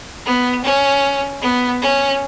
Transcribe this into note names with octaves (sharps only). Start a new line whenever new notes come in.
B3
C#4
B3
C#4